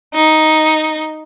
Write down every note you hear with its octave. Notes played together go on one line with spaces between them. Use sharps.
D#4